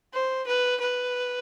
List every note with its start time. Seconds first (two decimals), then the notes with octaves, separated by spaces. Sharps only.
0.14 C5
0.47 B4
0.81 B4